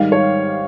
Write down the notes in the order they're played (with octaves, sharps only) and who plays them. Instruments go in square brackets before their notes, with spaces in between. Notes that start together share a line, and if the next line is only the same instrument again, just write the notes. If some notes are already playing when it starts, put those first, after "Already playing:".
Already playing: [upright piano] G#2 D#3 G3 F5
C#5